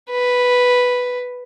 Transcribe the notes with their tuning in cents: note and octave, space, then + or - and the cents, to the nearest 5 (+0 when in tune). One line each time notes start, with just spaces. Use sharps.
B4 +0